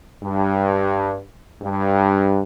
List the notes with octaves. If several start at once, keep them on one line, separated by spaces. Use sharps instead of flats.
G2
G2